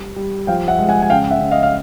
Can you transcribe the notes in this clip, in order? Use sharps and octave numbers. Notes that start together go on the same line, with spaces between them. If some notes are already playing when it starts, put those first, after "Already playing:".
Already playing: G3
G3
F3 F5 G5
E5 F#5
G#3
F#5 G#5
G#5
C#3 F5 G5
E5 F#5
C#3
D#5 F5
F5